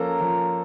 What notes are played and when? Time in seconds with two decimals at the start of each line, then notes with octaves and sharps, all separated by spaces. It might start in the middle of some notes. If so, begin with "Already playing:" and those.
Already playing: F3 A#3 C#4 A4 A#5
0.20 F3